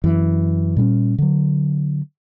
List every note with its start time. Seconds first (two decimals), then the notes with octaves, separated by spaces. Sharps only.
0.04 F#2 E3
0.77 A#2 G3 B3 C#4
1.18 D3 F#3